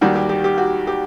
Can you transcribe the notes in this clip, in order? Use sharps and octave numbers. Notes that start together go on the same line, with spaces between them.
D#2 D#3 G3 F#4
G4
G4
G4
F#4
G4